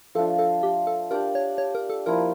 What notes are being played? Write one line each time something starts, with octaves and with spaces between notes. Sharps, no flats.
F3 A3 D4 F4 A4
A4
G4
A4
D4 G4 A#4 D5
C#5
C#5
A#4
A4
F3 A#3 E4 A#4